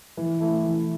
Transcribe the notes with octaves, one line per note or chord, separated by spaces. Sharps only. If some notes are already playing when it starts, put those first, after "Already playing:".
E3
A3 E4
E3